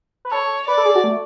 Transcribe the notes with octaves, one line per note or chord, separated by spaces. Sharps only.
B4
A4 C#5
B4 D5
A4
G#4
F#4
A3